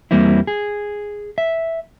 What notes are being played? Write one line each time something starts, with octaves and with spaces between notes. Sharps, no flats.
E2 G3 A#3 C4 E4
G#4
E5